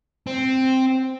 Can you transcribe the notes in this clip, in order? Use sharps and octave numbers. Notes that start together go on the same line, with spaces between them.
C4